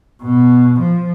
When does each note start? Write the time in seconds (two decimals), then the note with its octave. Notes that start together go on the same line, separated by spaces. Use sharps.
0.23 B2
0.79 F3